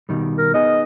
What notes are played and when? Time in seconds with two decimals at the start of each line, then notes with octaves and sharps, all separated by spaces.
0.09 B2 D#3 G3
0.38 A#4
0.54 B3 D#4 G#4 D#5